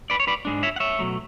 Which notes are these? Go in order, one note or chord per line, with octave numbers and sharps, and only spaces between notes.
B4 D5
C#5
B4 D5
G#2 G#3 D4
C#5 E5
F#5
C#5 E5
B2 F#3 A3